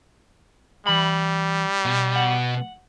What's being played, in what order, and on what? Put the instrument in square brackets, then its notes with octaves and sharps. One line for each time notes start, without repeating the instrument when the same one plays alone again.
[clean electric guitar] E3 B5 [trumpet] G3
[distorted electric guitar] B2
[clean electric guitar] F#5